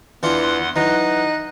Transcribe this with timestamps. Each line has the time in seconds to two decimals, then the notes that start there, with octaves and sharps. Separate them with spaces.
0.23 E2 E3 D4 F4 F#5 C6
0.76 E3 F#3 D#4 F#6